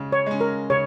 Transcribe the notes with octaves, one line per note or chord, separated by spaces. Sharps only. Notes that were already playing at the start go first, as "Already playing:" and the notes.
Already playing: C#3 G#3 C#4
C#5
G#3 C#4
A#4
C#3 C#5